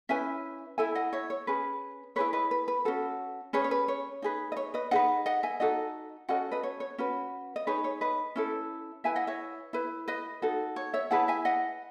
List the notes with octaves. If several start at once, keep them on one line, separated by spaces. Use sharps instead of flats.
C#4 E4 B4 E5 G#5
E4 A4 E5 G#5
D#5 F#5
C#5 E5
C#5
C#4 G#4 B4
E4 G#4 B4 C#5
B4 D#5
B4
B4
C#4 F#4 A4
C#4 G#4 B4 C#5
C#5
B4
C#5
D#4 G#4 B4
D#5
C#5
B4 D#5
D#4 G#4 B4 D#5 F#5
D#5 F#5
E5 G#5
D#4 F#4 A4 D#5 F#5
C#4 F#4 A4 D#5 F#5
B4 D#5
C#5
C#5
C#4 F#4 B4
D#5
D#4 G#4 B4 C#5
C#5
B4 D#5
C#4 E4 A4
E4 B4 E5 G#5
D#5 F#5
C#5 E5
E4 B4
B4 D#5
D#4 F#4 A4
C#5
C#5 E5
E4 G#4 B4 F#5 A5
E5 G#5
D#5 F#5